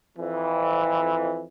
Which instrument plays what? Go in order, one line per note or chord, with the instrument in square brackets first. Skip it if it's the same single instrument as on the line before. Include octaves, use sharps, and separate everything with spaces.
[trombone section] F2 E3